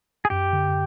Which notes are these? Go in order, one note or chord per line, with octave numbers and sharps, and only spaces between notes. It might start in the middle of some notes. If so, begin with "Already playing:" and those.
G#4
F#2 G4
D3